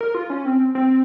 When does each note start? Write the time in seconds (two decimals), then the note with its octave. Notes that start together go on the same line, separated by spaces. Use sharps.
0.01 A#4
0.15 F4
0.30 C#4
0.45 C4
0.75 C4